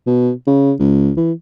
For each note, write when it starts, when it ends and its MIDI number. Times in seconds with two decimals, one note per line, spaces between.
0.07 0.31 47
0.47 0.73 49
0.79 1.11 37
1.17 1.32 52